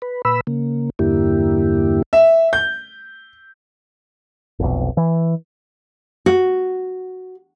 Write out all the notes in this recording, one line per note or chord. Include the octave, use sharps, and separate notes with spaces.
B4
A#2 B4 B5 E6
C#3 A#3
E2 G2 D3 A#3 E4 G4
E5
G6
F1 B1
E3
F#4